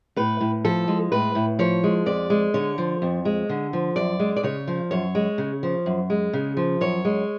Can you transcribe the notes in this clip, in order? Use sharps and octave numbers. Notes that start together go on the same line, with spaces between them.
A2 B4
A2
F3 A4
G#3
A2 B4
A2
F3 C#5
G#3
F2 D5
G#3
D3 C#5
F3
F2
G#3
D3
F3
F#2 D5
G#3
D5
C#3 C#5
F3
F#2 C#5
G#3
C#3
F3
F#2
G#3
C#3
F3
F#2 C#5
G#3